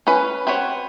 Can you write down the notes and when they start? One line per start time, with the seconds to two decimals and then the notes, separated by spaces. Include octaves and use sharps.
0.07 C#4 B4
0.47 C4 F#4 B4 C#5